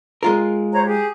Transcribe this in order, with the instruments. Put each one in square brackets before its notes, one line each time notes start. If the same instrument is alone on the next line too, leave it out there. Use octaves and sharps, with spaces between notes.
[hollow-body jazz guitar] G#3 F4 A#4
[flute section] C5 C#5 A#5
G4 G#4